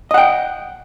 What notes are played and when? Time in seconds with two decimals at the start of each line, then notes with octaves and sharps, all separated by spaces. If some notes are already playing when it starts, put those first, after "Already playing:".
0.11 D#5
0.14 F#5
0.18 G5